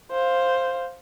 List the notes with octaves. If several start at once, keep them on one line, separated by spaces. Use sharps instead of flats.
C5 F5